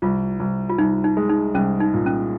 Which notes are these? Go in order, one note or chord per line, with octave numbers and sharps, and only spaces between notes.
C2 F4
C2
F4
C2 D#4
D#4
G#3
D#4
C2 C#4
D#4
A#2
C#4